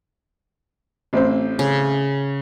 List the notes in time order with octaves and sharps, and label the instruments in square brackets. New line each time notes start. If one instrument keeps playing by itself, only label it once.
[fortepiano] A1 C4 C5
[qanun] C#3